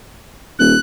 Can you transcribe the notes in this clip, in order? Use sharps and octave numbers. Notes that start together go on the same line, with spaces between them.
D#1 F#6